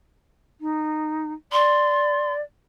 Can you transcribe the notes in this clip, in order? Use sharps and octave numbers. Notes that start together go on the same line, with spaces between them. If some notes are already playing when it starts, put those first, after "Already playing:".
D#4
D5 C6